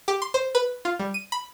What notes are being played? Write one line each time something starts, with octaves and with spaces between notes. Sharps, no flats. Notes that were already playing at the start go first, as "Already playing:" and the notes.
G4
C6
C5
B4
F4
G3
D#7
B5